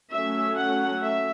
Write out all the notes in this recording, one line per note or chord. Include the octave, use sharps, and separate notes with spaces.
F#3 A3 C#4 E5
F#5
E5